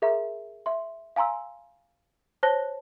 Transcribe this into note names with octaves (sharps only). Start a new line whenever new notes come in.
G#4 A#4 E5 A#5 C6
E5 C6
F5 G#5 A#5 C6 E6
C5 C#5 A5 F#6 A#6 G7